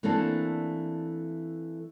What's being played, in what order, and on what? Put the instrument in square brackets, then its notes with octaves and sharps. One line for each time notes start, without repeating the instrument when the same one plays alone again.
[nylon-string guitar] E3 A3 A#3 C4 D4 A4